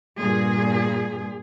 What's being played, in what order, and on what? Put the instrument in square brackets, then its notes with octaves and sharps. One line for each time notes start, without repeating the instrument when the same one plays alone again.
[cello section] G2 A#2 G#4